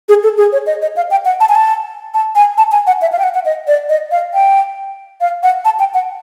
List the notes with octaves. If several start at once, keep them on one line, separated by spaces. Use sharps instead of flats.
G#4
A4
G#4
C#5
D#5
D#5
F5
G5
F#5
A5
G#5
A5
A5
G#5
A5
G#5
F#5
E5
F5
G5
F#5
F#5
D#5
D5
D#5
F5
G5
F5
F#5
A5
G5
F#5